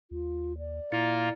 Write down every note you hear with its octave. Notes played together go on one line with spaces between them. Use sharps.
D#2 F4
D5
A#2 A#3 E4 F4 A6 C#7